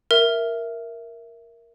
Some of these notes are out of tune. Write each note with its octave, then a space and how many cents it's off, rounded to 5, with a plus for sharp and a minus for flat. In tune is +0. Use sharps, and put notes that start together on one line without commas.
A#4 +0 E5 +5